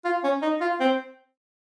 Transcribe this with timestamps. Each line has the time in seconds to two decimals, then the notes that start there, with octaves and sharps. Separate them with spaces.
0.05 F4
0.24 C#4
0.42 D#4
0.61 F4
0.80 C4